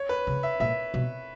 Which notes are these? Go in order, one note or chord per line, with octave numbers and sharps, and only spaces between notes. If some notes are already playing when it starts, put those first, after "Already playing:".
Already playing: C#5
B4
C#3
E5
A#2 E5
B2